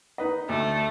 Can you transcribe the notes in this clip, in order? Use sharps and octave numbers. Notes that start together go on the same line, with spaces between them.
D#4 B4 D#5
D2 A3